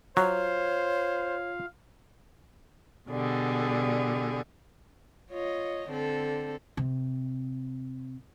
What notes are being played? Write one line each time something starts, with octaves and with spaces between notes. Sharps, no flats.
F#3 F4 C5 C#5 F5
B2 D3 G3 G#4
F4 C#5 D#5
D3 C4 A4
C3